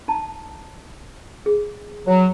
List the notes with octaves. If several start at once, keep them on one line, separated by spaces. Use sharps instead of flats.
D#4 A5 A#5
G#4
F#3